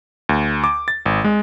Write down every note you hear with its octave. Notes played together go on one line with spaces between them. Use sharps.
D2
D6
A6
G#1
G#3